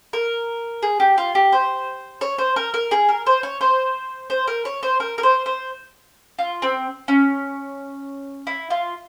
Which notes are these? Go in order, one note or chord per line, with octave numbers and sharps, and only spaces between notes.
A#4
G#4
G4
F4
G4
C5
C#5
C5
A#4
A#4
G#4
A#4
C5
C#5
C5
C5
A#4
C#5
C5
A#4
A#4
C5
C5
F4
C4
C#4
E4
F4